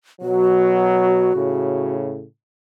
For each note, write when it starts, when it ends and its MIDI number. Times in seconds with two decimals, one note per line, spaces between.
0.22 1.30 47
0.22 1.30 54
0.22 1.93 66
1.35 2.25 45
1.35 2.25 49